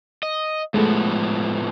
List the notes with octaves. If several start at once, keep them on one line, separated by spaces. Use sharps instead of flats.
D#5
A2 F3 G#3 A3 B3